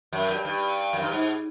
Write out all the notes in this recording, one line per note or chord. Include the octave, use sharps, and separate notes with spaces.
F#2
G2
G2
F#2
G2
G#2